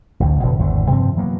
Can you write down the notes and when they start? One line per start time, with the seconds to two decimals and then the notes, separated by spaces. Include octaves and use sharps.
0.20 A1 D2
0.42 E1 B2 D3 E3
0.58 G#1 E2 D3 D#3
0.90 G2 C3 F3 C4
1.16 E3 F#3 A#3 B3